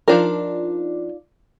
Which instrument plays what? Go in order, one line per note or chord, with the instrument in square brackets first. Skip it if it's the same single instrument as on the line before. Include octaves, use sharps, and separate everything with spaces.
[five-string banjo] F3 D4 A#4 [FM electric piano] D#4 F4 D5